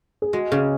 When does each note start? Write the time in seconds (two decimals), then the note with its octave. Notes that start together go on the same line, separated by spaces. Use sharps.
0.22 G#4
0.33 G#3 F#4
0.52 C#3 G#4